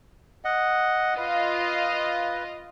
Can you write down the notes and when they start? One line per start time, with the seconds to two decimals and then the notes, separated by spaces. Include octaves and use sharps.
0.45 D#5 F#5
1.17 F4 B4 D#5 F5